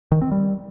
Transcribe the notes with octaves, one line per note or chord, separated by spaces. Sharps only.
D#3
C4
G3